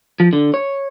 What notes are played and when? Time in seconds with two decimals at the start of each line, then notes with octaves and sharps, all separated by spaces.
0.20 F3
0.33 D3
0.54 C#5